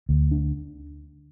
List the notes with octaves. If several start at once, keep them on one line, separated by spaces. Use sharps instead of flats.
D2
D4